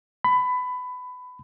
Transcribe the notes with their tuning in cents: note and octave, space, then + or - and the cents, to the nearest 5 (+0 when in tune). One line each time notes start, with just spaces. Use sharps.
B5 +20